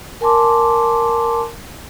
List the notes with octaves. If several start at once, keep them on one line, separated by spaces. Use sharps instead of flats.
A#4 G#5 A5 C6 D6